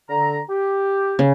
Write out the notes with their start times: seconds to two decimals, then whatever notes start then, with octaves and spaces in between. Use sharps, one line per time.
0.10 D3 A#5
0.49 G4
1.19 C#3